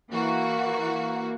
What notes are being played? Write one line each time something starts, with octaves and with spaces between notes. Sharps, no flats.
E3 A#3 F#4